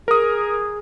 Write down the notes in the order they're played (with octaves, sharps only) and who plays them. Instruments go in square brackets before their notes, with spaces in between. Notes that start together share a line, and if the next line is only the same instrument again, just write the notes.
[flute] G#4 [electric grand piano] A#4 D#6